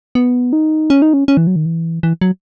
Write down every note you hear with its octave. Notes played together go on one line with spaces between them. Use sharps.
B3
D#4
C#4
D#4
C#4
C#4
E3
F#3
D#3
E3
E3
F#3